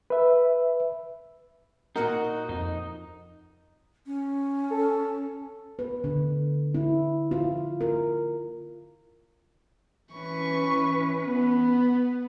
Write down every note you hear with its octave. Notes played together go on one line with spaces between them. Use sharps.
B4 E5
A#2 D#4 F#4 A#4 F#5
F2 D#4
C#4
A4
B4
D3
E4
F4
A#4
E3 C#4 B4 C#6
B3